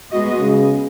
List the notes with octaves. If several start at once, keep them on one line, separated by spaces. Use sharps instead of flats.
G#3 B3 F#4 D#5
C#3